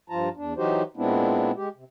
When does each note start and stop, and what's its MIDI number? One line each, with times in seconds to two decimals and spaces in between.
0.10 0.29 43
0.10 0.29 53
0.10 0.29 65
0.10 0.29 81
0.10 0.29 82
0.36 0.54 40
0.36 0.54 62
0.57 0.83 52
0.57 0.83 54
0.57 0.83 63
0.57 0.83 66
0.57 0.83 67
0.57 0.83 72
0.97 1.51 46
0.97 1.51 56
0.97 1.51 59
0.97 1.51 60
0.97 1.51 62
0.97 1.51 64
1.56 1.69 56
1.56 1.69 67
1.76 1.84 48